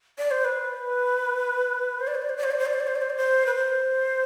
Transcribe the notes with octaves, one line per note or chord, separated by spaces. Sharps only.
D5
C5
B4
C5
D5
C5
D5
C5
D5
C5
D5
C5
D5
C5
D5
C5
D5
C5
D5
C5
B4
C5